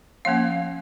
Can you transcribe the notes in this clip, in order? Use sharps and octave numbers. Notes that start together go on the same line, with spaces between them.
F3 A#3 C#4 F5